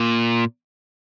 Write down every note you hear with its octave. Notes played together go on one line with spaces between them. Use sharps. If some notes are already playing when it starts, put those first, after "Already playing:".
Already playing: A#2